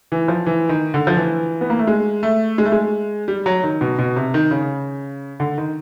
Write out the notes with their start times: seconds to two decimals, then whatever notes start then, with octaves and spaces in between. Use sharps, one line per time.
0.12 E3
0.28 F3
0.46 E3
0.69 D#3
0.94 D3
1.07 F3
1.17 E3
1.61 B3
1.70 A#3
1.79 A3
1.87 G#3
2.23 A3
2.58 G#3
2.65 A3
2.72 G#3
3.28 G3
3.46 F#3
3.63 D#3
3.81 B2
3.99 B2
4.16 C3
4.34 D#3
4.51 C#3
5.40 D3
5.58 D#3